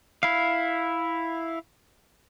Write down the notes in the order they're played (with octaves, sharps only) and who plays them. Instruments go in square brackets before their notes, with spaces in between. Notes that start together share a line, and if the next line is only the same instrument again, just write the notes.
[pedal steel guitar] E4 F5